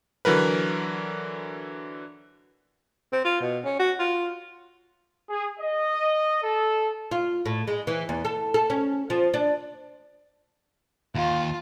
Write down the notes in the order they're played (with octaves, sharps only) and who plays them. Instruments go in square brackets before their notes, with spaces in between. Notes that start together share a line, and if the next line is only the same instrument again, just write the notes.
[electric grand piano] D3 E3 F#3 A#4 B4
[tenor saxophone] C4
F4
B2
C#4
F#4
F4
[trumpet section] G#4
D#5
A4
[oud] F4
A2
G#3
E3
E2
A4
A4
C#4
F3
D4
[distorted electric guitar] D#2 [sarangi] F4